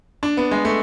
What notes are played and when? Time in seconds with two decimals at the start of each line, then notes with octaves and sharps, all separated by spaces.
0.23 D4
0.37 B3
0.51 G#3
0.65 A3